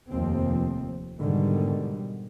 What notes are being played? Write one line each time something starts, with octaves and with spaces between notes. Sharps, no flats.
F1 D#2 F3 C4
G#2 B2 D3 D#3 G3